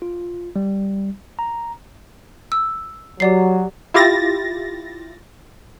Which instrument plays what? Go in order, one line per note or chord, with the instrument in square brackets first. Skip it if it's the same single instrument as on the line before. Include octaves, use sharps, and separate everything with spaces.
[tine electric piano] F4
G3
A#5
[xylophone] E6
[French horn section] F#3 [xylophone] G4 D5 C7
[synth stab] E4 F4 G4 A6 A#6